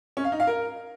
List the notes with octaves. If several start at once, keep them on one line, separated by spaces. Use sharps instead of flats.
C#4
F5
D#4
F5
A#4